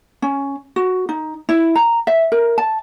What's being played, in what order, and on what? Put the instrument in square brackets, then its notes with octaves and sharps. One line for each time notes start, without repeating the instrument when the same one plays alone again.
[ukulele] C#4
F#4
D#4
E4
A#5
E5
A#4
A5